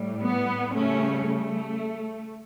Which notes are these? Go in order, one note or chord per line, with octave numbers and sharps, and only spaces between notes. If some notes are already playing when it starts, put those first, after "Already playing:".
Already playing: A2 G3
B3
C#3 G3 A3 C#4
A3